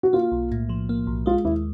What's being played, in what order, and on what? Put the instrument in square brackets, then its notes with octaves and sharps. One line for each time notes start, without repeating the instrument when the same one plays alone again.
[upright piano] F#4
[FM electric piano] A#3 [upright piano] F4
[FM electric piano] B1
A2
F3
A#3
B1
[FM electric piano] G#3 [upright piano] F4
[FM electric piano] D#2 [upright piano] E4